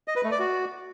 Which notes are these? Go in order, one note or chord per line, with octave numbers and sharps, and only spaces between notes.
D#5
B4
A3
D5
F#4